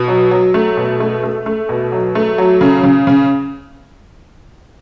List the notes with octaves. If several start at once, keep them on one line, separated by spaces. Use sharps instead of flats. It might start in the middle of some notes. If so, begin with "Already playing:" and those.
Already playing: B2
F#3
F#3
A3
B2
A3
A3
A3
B2
F#3
A3
F#3
C#3
C#3
C#3